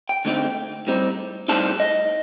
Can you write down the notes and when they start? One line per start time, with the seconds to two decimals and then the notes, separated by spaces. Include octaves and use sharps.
0.09 G5
0.25 D3 A3 C4 D#4
0.87 A2 G3 C4 D#4
1.48 A2 G3 C4 D#4 A5
1.80 D#5